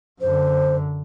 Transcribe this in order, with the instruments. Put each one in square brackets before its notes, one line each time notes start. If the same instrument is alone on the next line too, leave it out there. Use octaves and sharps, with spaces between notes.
[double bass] F#2 D3 [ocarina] C5